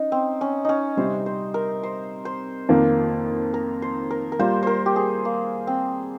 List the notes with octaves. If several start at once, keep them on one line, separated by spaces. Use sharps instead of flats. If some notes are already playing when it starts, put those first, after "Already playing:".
Already playing: C#4 D#4
C4
C#4
C#4 D#4
C3 G3 C4 C5
C5
A#4
C5
C5
F2 D#3 A#3
A#4
C5
A#4
A#4
G3 A#3 F4 C5
A#4 C5
G4
G#4
A#3
C4